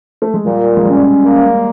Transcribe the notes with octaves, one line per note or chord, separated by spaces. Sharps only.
A3
G#3
A#2 G3
G#3
G3 C#4
A#3